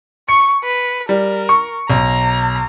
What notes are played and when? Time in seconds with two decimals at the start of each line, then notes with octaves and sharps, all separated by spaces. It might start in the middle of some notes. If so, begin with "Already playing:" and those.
0.29 C#6 C#7
0.64 B4
1.09 G3 A#4
1.49 C#6
1.90 B1 A#5